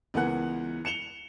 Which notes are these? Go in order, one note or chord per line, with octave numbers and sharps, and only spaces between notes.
C#2 E3 B3 A#4 F#5 F#6
C#7 E7 F7 G7